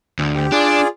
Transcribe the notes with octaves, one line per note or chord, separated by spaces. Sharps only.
D2
G4
D4 F4 G#4 D5